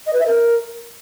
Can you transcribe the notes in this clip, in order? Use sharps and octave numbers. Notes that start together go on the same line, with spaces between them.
D#5
B4
E5
A#4